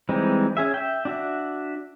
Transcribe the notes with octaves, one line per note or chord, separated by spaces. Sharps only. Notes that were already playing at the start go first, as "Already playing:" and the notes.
E3 G3 G#3 C4 D#4
C#4 G#4 E5
E5 G5
D4 F#4 E5